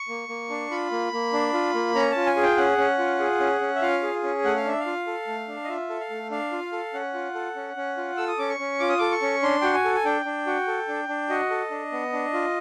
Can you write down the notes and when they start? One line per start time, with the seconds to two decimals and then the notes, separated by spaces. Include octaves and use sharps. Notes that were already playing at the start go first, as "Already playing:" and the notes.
Already playing: C#6
0.09 A#3
0.29 A#3
0.50 D4
0.71 F4 B5
0.91 A#3
1.13 A#3
1.33 D4
1.54 F4
1.74 A#3
1.95 C#4 A#5
2.11 A5
2.16 F4
2.26 G#5
2.37 G#4
2.43 G5
2.57 C#4 F#5
2.78 C#4
2.99 F4
3.19 G#4
3.40 C#4
3.61 C#4
3.75 E5
3.82 F4 F5
4.03 G#4
4.23 C#4
4.44 A3 F#5
4.57 F5
4.65 D4 E5
4.80 F5
4.86 F4
5.07 A4
5.27 A3
5.48 D4
5.64 D#5
5.69 F4 E5
5.90 A4
6.01 F5
6.10 A3
6.31 D4 F5
6.52 F4
6.73 A4
6.94 C#4 F#5
7.14 F4
7.35 A4
7.56 C#4
7.77 C#4
7.97 F4
8.17 A4 E6
8.28 D#6
8.38 C#4 D6
8.49 C#6
8.59 C#4
8.80 F4 D6
8.89 D#6
8.98 A4 D6
9.11 C#6
9.22 C#4
9.43 D4 C6
9.62 F#4 G5
9.74 G#5
9.85 A4
9.95 G#5
10.05 D4 G5
10.25 D4
10.47 F#4
10.67 A4
10.88 D4
11.09 D4
11.29 F#4 D#5
11.50 A4
11.71 D4
11.92 B3
12.13 D4
12.34 F4